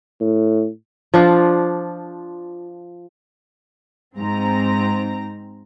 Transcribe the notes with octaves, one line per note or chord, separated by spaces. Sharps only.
A2
F3 D4 F4
G#2 C4 A#5